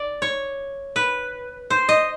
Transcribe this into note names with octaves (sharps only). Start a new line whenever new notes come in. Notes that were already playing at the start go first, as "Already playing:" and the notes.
Already playing: D5
C#5
B4
C5
D#5